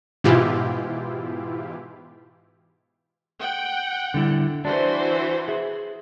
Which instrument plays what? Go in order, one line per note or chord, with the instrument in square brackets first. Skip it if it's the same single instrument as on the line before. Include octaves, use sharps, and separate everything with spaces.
[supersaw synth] G#2 B2 E3 E4 F4 G4
[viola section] F#5 G5
[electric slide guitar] D3 G3 E4
[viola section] E3 F#4 C5 [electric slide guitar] D4
[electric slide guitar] G#4 E5